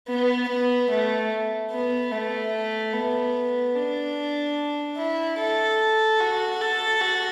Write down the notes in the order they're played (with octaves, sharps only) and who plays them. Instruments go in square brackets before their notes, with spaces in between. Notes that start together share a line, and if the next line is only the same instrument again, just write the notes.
[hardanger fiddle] B3
B3
A3
B3
A3
B3
D4
E4
A4
F#4
A4
F#4